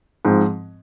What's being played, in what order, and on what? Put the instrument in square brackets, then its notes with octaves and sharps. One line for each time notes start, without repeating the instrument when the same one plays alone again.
[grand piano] G#2 F3 C4